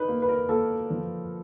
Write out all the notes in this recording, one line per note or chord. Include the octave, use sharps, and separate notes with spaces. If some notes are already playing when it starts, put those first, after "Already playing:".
Already playing: D#4 B4
A#3
B4
A#4
A#3 A4
F3